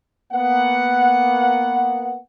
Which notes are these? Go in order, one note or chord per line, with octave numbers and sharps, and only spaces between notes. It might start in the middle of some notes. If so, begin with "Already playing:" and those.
A#3 B3 F#5